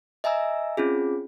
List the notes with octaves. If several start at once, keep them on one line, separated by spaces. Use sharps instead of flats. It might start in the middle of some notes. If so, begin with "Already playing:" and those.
D#5 E5 G#5 A#5 E6
C4 C#4 F4 G#4